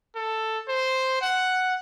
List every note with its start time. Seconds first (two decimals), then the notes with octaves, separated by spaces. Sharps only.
0.16 A4
0.68 C5
1.22 F#5